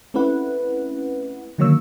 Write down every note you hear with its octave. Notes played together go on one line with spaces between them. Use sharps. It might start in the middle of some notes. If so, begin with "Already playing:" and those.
A3 C4 C#4 E4 B4 F#5
D3 D#3 F#3 A#3 C#5 E6